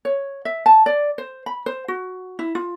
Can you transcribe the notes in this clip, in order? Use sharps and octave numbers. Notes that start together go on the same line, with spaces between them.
C#5
E5
A5
D5
C5
B5
C5
F#4
E4
F4